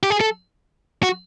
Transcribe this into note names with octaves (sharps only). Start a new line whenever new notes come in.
G4
G#4
A4
F#4